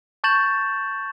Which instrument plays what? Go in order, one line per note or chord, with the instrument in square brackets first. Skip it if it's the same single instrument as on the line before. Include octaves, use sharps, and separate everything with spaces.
[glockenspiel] A5 C#6 G6 A6 E7 F#7